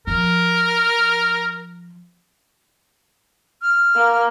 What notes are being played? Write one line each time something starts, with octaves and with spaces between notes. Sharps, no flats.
F3 A#4
F6
A#3